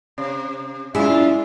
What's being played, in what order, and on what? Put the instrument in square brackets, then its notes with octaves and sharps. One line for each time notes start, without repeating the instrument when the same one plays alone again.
[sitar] C3
[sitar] F#2 F4 [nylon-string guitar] G#3 D4 G#4 [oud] E4 [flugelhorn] E5